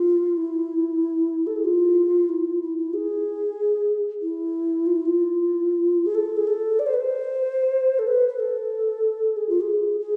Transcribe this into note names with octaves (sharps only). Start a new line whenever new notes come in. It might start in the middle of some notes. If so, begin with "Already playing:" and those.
Already playing: F4
E4
A4
G#4
F4
E4
F4
E4
E4
G#4
E4
F4
E4
F4
G#4
A4
G#4
A4
D5
C5
B4
C5
A4
B4
B4
A4
G#4
F4
G#4
G#4